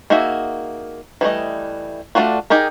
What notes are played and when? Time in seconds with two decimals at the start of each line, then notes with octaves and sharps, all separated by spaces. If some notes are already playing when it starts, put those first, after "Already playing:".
0.10 A#3 D#4 F#4 G#4 E5
1.21 E3 G3 A3 D#5
2.15 A3 B3 D4 F4 F#4
2.50 D#4 G4 G#4 A#4